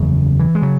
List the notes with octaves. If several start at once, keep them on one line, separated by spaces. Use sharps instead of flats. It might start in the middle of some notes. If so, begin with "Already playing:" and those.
Already playing: F#1 E2 C#3
E3
G#3
C#3 F#3